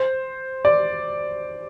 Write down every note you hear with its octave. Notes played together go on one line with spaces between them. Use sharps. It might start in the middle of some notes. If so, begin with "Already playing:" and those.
Already playing: C5
D5